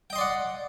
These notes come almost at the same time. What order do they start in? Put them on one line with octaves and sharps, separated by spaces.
G5 D#5 C6 D5 F#5